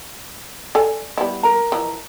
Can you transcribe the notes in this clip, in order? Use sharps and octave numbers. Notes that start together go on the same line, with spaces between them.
A4 D5 G#5
G3 B3 E4
A#4 A#5
E3 F3 D#5